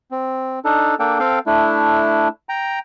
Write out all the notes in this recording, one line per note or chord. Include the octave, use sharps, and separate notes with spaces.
C4
D4 D#4 A4
A#3 D4 A4 G5
C4 A4 F5 G5
A3 D4 E4
G5 A#5